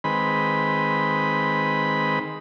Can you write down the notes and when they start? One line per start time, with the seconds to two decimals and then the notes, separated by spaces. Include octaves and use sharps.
0.04 D#3 G#3 C4 B4 B5